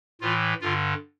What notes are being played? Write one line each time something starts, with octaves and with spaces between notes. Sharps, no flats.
A2 E3 F4
G2 D3 F4